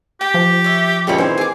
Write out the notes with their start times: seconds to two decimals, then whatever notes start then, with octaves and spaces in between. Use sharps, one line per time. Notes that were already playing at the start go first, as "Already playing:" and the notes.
0.21 G4 G5
0.34 F3
0.64 C#5 E5
1.07 C#2 A#2 G#3 G4 C#5 B5
1.18 D#3 E3 C4 C5 G#5
1.38 G#4 D6